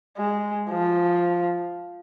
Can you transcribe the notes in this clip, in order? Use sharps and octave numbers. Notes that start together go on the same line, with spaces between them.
G#3
F3